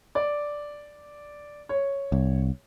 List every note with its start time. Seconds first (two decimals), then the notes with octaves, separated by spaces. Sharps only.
0.15 D5
1.69 C#5
2.12 C2